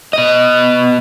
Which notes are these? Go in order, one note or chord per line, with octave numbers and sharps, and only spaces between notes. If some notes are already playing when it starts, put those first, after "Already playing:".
B2 D#5